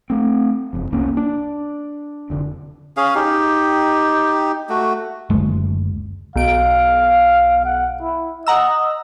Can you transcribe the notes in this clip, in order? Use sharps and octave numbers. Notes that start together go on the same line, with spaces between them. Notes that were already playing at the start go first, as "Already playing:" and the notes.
A3 C4
F#1 F2
C2 A#3 C#4
D4
F1 D3
C#4 G#4 F5
D#4 G4
A3 F#4
F#1 D2 G#3
B1 F5 D7
F#5
E4
D#5 F#5 A#5 E6